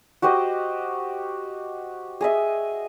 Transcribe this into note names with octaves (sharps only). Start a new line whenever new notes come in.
F#4 G4 C5 D#5
G#4 D#5 E5